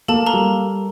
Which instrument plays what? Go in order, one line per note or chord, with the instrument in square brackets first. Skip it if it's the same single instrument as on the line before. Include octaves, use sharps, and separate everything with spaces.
[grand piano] A#3 [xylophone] A4 A5
[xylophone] A#4 A#5
[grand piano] G3